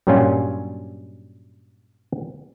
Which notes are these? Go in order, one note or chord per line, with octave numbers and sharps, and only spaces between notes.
G2 A#2 F#3 G3 C#4 F4